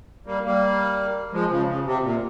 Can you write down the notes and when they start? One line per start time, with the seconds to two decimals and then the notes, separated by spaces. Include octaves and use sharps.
0.26 G3 A#3
0.44 G3 A#3
1.33 F3 G#3
1.50 C#3 F3
1.67 C#3
1.86 C3
2.03 A#2